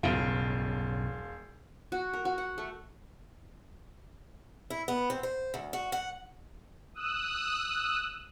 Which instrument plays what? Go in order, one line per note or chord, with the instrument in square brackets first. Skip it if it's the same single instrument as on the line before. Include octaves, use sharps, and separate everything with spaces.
[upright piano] E1 F4 [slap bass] B1 G2 C#3
[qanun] F#4
A#4
F#4
F#5
A3
[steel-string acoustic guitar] E4
B3
C4
C5
D2
F#4
F#5
[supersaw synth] D#6 E6 F#6